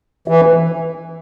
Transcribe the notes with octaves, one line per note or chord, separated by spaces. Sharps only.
E3